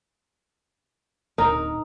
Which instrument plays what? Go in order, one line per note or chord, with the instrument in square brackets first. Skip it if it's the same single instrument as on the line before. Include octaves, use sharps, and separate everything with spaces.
[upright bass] D1 [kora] D#4 A#4